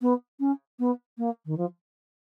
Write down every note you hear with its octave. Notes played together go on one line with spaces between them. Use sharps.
B3
C#4
B3
A#3
D#3
F3